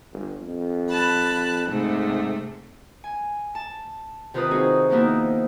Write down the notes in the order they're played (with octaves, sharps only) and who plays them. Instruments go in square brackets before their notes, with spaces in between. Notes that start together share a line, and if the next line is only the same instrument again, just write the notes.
[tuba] G1
F2
[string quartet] A5 B5 F#6
[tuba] G#2 [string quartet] C3 A3
[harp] G#5
A5
C3 D#3 F4 B4 D#6
C4 D#4 F#4 G#4
D#3 F3 A#3 B3 D#4 E4